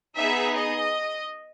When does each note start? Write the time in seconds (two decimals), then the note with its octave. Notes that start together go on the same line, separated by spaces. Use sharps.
0.16 B3 D#4 G#4 E5
0.55 D#5